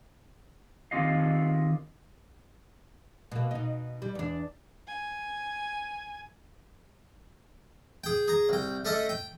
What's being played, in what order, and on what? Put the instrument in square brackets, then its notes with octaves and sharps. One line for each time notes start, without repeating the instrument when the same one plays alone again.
[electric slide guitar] D#3 C4 F4 G4 D#5 F5
[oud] B2 A#3
B2 D#4
G3
E2 D4
[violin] G#5
[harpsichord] G#4 G5
G#4 A#5
C2 G5
A3 C#4 A4 D#5 E5
G5